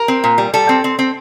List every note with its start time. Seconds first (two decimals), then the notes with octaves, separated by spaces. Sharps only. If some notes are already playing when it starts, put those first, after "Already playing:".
Already playing: A#4
0.08 C4
0.24 A#2
0.38 G3
0.54 G3 A4
0.69 C4
0.84 C4
0.99 C4